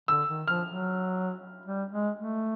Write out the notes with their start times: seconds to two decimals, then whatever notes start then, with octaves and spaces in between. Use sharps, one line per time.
0.08 D3 E6
0.29 D#3
0.48 F3 F6
0.68 F#3
1.65 G3
1.92 G#3
2.18 A3